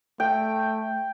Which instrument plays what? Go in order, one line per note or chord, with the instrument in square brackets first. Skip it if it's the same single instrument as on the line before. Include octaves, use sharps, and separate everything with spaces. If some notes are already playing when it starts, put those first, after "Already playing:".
[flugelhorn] A3 [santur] G5